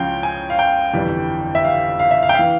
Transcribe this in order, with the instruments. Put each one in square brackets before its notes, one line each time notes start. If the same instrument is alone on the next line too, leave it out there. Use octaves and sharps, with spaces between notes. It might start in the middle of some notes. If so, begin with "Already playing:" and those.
Already playing: [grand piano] C#2 C#3 F3 F5 G5
G#5
F5
G5
G1 F2 E3 G3
E5
F5
F5
E5
F5
G5
E3 F5